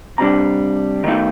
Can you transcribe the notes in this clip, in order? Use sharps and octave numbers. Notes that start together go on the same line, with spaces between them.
C3 G3 D4 A#5
D#3 A3 D#4